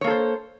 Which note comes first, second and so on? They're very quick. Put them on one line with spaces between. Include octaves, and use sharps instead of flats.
C#5 A#3 A4 C5